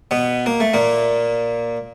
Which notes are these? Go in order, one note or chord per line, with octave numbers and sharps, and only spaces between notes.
B2 B3
A#3
A3
A#2 A#3